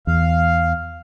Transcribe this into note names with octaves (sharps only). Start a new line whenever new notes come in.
E2 F5